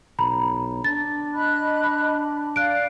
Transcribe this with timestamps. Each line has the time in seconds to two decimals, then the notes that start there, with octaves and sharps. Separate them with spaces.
0.19 B1 A#5 B5
0.84 D4 A6
1.33 D#5 B5 F#6
2.56 D5 F5 F#6 D7